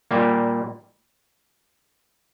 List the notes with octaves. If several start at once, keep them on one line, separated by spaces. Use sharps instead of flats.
A#2 G3 A#3